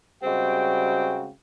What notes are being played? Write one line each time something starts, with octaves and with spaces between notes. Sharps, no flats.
C#3 G3 G#3 C4 F#4 G5